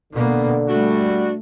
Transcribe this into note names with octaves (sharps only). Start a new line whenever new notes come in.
B2 D3 A#3 B3
G3 A3 D4 F#4